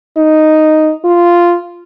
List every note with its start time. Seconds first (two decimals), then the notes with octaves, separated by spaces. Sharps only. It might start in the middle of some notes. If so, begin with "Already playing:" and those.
0.17 D#4
1.05 F4